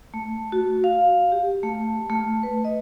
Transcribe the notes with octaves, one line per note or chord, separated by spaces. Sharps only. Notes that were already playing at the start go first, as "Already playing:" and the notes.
A3
F#4
F5
G4
A3
A3
B4
D#5